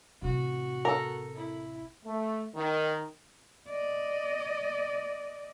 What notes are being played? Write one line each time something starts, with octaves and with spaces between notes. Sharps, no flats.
A1 C3 F#4
A4 A#4
E4
A3
D#3
D5 D#5